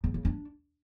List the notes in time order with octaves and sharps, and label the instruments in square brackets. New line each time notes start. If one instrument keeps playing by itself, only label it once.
[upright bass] C#3
C#3
D4